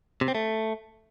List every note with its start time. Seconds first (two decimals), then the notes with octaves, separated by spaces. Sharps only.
0.21 C3
0.28 C4
0.35 A3